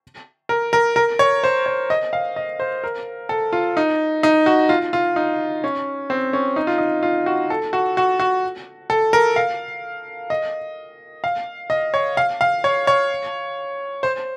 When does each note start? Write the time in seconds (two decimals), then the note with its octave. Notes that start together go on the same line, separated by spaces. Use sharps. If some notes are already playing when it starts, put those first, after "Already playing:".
0.49 A#4
0.73 A#4
0.96 A#4
1.19 C#5
1.44 C5
1.66 C#5
1.90 D#5
2.13 F5
2.36 D#5
2.60 C5
2.84 A#4
3.29 A4
3.53 F4
3.77 D#4
4.23 D#4
4.46 F#4
4.69 F4
4.93 F4
5.16 D#4
5.64 C#4
6.10 C4
6.33 C#4
6.56 D#4
6.67 F4
6.78 D#4
7.03 F4
7.26 F#4
7.50 A4
7.73 F#4
7.97 F#4
8.20 F#4
8.90 A4
9.13 A#4
9.36 F5
10.30 D#5
11.24 F5
11.70 D#5
11.94 C#5
12.17 F5
12.41 F5
12.64 C#5
12.87 C#5
14.03 C5